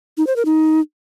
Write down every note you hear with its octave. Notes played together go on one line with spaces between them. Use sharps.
D#4
C5
A#4
D#4